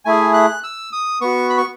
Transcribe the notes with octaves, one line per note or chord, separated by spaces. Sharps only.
A3 E4 G#4 G#5
F#6
E6
D#6
B3 F#4 C#6
B5
C#6